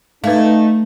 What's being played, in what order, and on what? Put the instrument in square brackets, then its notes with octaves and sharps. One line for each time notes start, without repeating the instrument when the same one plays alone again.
[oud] A3 [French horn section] D#4 [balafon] B4 F5